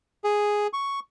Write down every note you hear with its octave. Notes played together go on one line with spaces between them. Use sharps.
G#4
C#6